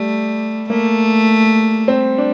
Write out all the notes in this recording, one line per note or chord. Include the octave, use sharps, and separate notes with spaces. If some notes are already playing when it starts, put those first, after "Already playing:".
Already playing: G3 A3
A3 A#3
G3 C4
D4